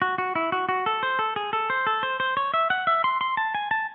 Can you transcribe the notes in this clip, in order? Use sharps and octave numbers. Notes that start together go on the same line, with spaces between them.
F#4
F#4
E4
F#4
F#4
A4
C5
A4
G#4
A4
C5
A4
C5
C5
C#5
E5
F#5
E5
C6
C6
A5
G#5
A5